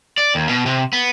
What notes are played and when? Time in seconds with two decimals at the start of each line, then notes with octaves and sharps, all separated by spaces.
0.18 D5
0.35 D#2
0.49 B2
0.66 C3
0.93 B3